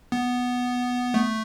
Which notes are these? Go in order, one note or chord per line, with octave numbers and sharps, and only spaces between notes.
B3
A3